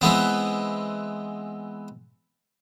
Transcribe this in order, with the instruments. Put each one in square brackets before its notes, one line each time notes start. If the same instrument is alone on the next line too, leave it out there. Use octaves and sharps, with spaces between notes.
[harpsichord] E3 G#3 B3 C4